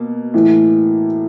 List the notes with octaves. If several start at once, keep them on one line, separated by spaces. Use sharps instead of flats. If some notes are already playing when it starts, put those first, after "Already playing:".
Already playing: B2 A#3
A2 E3